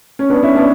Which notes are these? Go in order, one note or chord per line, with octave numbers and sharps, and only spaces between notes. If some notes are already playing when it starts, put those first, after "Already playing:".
C#4
B3 D4
C#4 E4
B3 D4